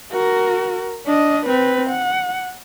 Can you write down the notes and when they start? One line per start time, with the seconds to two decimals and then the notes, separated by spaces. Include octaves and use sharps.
0.11 F#4 A#4
1.06 D4 D#5
1.46 C4 B4
1.90 F#5